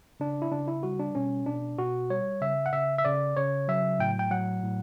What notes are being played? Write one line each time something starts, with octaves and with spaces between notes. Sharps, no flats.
C#3 D4
E4
C#3 D4
E4
G3 F#4
D4
B2 C#4
B2 D4
B2 F#4
G3 C#5
C#3 E5
F#5
C#3 E5
E5
C#3 D5
C#3 C#5
F#3 E5
A2 G5
G5
F#3 F#5
A2